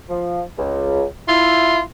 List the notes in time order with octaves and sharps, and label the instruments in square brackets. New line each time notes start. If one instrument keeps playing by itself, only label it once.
[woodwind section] F3
C#2
[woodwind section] E4 [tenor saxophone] F4